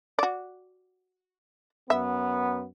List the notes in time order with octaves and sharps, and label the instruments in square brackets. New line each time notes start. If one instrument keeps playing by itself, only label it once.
[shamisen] F#4 D5
[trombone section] F#2 B3 [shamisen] E5